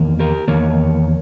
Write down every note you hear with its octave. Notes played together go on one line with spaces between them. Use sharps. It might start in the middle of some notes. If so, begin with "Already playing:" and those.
Already playing: E2 D#3 A#3
G4 A#4
E2 D#3 A#3 A#4 C#5